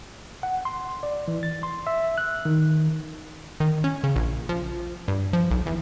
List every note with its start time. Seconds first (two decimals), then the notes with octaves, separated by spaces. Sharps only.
0.43 F#5
0.65 C6
1.03 D5
1.28 E3
1.43 A6
1.63 C6
1.87 E5
2.18 F#6
2.45 D#3
3.60 D#3
3.84 C#4
4.04 C#3
4.16 A#1
4.49 F3
5.08 G2
5.33 F3
5.51 B1
5.66 E2